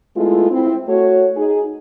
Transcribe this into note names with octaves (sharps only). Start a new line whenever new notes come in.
G#3 A3 B3 E4 F4
C4 E4
A3 F#4 C#5
D#4 G#4